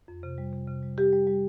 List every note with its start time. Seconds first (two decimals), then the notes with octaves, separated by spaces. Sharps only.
0.08 F2
0.23 C3
0.38 G3
0.53 C3
0.68 C3
0.83 G3
0.98 G3 G4
1.13 G3
1.27 G3